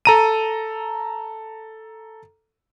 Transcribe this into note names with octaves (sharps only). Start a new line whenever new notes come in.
A4 A#5 D#7